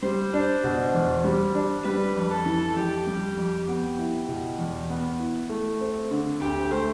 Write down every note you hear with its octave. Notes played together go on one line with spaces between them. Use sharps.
G3 C5
D4
B2
E2
G3
D4
G3 B4
F2
A4
E3
F2 G4
G3
F2
B3
E4
B2
E2
B3
E4
A3
C4
D3
D2 G4
A3 C5